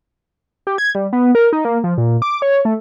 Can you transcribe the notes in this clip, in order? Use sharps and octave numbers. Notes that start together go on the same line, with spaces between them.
G4
G#6
G3
B3
A#4
D#4
A#3
F3
A#2
D6
C#5
A3